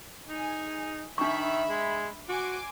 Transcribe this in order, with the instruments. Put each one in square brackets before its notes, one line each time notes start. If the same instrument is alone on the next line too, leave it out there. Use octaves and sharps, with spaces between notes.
[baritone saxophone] D#4 [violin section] G#4 G#5
[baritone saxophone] D#3 [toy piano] D4 C#6 [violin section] E5 B5
[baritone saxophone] G#3
[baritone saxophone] F#4 [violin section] G#5 C6 D6